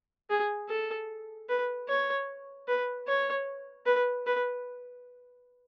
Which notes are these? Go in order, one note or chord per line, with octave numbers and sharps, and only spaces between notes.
G#4
A4
B4
C#5
B4
C#5
B4
B4